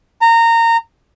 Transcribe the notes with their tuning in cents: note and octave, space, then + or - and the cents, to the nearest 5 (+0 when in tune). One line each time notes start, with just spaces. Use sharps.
A#5 -20